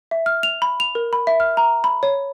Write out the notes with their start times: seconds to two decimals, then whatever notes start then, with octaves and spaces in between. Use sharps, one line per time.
0.11 E5
0.26 F6
0.43 F7
0.62 B5
0.80 F7
0.95 A#4
1.13 B5
1.27 E5
1.40 F6
1.57 A#5
1.84 B5
2.03 C#5